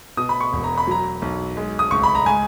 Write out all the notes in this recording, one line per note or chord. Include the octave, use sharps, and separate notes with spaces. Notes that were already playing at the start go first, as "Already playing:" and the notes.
B2 D#6
B5
C#6
E1
A#5
B5
F#3 A#5
B1
G#3
D#6
C#2 C#6
B5
A#5
G#3 G#5